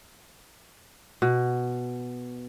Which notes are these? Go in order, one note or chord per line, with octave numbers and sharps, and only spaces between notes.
B2